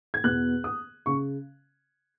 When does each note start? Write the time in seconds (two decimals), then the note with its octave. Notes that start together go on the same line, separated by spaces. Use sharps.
0.14 G#6
0.24 E2 B2 F#6
0.64 D#6
1.06 C#3 C#6